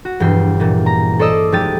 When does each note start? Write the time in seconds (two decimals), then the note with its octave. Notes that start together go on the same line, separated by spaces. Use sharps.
0.05 F#4
0.20 E1 G2 E3 G3 G5 C7
0.60 A#2 E3
0.86 A#5
1.19 A4 C5 D5 D#5 E6
1.52 F1 G#3 G4 A6 D#7